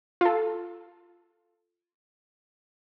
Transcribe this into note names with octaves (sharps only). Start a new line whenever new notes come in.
F4 A4